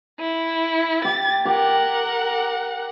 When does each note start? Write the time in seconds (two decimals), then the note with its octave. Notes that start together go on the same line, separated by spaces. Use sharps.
0.20 E4
1.05 G4 A6
1.46 G4 A#4 F#5